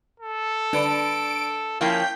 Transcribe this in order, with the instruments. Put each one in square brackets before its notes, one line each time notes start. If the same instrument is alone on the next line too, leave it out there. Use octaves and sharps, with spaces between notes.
[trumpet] A4
[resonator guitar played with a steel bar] D3 [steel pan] D4 B4 [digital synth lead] D7
[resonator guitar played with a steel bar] F3 A#3 E4 [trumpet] C#4 [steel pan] F5 [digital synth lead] G5